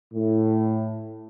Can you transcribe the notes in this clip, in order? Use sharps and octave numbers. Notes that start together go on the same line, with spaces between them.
A2